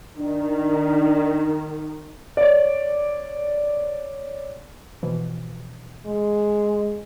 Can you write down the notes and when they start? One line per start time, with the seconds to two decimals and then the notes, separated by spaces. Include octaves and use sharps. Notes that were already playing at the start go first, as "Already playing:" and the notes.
0.18 D#3 D4
2.37 C#5 D5
5.03 B2 E3 F3
6.06 G#3